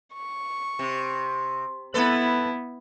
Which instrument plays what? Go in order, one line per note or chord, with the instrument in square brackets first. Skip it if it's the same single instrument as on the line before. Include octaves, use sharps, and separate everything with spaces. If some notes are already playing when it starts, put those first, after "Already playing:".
[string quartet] C#6
[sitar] C3
[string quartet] B3 E4 [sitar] A4 B4